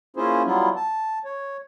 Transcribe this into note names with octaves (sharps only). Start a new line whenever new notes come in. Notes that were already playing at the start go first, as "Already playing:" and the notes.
A#3 C#4 E4 F4 G#4 C5
F#3 G3 B3 E4 F4
A5
C#5